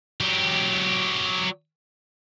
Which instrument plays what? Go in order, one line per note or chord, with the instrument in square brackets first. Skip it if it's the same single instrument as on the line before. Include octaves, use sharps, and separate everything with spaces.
[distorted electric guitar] F#3 G4